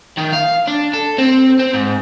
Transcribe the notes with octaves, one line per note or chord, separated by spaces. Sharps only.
D#3
F5
D4
A4
C4
C4
G#2